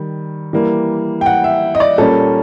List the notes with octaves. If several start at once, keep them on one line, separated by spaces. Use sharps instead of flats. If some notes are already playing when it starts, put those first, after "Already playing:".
Already playing: D#3 G3
E3 G3 A#3
G5
F#5
E5
D#5
D5
A#2 G3 A#3 C#4 A4